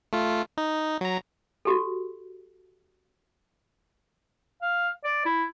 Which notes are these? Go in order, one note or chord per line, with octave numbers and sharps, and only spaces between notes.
A3 F4
D#4
F#3 A#5
F#4 G4 A4
F5
D5
E4